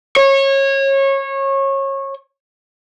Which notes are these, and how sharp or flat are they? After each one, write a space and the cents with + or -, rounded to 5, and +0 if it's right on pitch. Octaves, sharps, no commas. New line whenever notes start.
C#5 -25